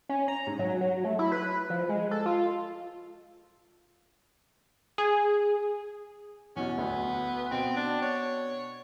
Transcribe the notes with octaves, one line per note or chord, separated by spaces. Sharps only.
C#4
A#5
G#2
F#3
F#3
A3
E4
B4
F3
G#3
A4
F4
G#4
E2 B2 C#4
D2 B3
B2 C4 D7
D4
C#5